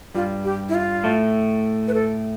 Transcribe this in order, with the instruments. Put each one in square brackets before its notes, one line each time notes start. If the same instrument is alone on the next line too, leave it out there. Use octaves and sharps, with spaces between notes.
[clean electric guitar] G2 G3 [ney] F4
[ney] G4
E4
F4
[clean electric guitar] A2 A3
[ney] B4
A4